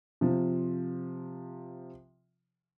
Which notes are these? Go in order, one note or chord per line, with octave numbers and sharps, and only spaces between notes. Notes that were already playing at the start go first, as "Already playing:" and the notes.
C3 F3